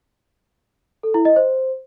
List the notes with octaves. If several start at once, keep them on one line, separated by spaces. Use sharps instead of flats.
A4
E4
D#5
C5